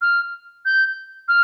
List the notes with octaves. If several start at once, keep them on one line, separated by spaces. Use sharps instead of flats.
F6
G6
F6